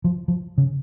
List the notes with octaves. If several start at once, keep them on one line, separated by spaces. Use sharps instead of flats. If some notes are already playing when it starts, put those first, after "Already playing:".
F3
F3
C#3